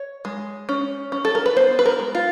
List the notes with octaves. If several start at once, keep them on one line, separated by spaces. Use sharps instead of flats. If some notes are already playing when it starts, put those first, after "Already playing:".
Already playing: C#5
G#3
C#4
C#4
A4
A#4
B4
B3 C5
B4
A#4
G#3
F4